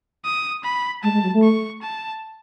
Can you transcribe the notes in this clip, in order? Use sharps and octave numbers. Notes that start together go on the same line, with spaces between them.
D#6
B5
G#3 A5
G#3
F#3
A3
C#6
A5